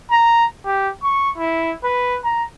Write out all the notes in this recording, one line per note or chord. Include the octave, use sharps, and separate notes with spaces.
A#5
G4
C#6
E4
B4
A#5